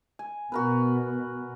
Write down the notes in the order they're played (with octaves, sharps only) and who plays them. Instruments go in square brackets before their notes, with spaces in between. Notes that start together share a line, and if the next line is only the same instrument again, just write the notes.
[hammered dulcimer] G#5
[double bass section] B2 B3 [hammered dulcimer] F#4 A#4 B4